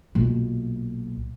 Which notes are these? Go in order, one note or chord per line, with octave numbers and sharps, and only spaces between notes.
B1 A#2